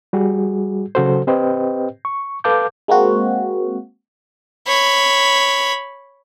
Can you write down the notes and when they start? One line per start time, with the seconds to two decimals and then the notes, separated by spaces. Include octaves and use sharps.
0.13 G3 F#4 G#4
0.95 C#3 F#3 F#4 A4 C5
1.27 C4 G4 B4 C5 D#5 G5
2.05 C#6
2.44 A4 B4 F5 A5 D6 G6
2.88 G#3 A#3 C4 F#4
4.67 C#5 B5